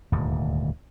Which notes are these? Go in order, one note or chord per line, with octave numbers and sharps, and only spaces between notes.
D#1 D2 G#2